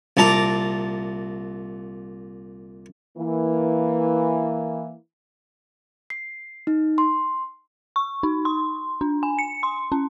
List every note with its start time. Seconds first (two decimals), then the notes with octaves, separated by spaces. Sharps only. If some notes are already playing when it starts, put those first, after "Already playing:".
0.17 C2 A#2 A5 A#5 D6
3.17 E3 A#3
6.10 C7
6.67 D#4
6.98 C6
7.96 C#6
8.23 D#4
8.45 C6
9.01 D4
9.23 G#5
9.39 C#7
9.63 C6
9.92 C#4